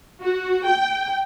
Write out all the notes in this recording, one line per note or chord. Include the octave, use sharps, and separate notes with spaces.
F#4
G5